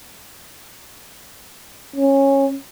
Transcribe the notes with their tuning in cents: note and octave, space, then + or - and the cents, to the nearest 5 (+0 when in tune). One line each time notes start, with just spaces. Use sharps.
C#4 -15